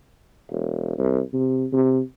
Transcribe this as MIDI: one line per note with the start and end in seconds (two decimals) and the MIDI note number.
0.50 0.93 28
0.98 1.20 36
1.34 1.66 48
1.73 2.00 48